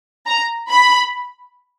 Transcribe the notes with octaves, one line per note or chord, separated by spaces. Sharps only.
A#5
B5